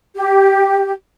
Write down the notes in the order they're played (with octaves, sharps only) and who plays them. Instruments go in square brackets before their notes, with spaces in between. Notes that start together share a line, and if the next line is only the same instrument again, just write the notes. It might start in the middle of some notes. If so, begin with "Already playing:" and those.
[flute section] G4